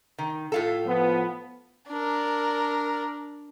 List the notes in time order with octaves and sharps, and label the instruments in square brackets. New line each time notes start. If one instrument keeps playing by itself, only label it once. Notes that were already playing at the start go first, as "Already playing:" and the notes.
[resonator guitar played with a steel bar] D#3
A2 F4 A4
[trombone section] F3 B3
[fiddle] D4 A#4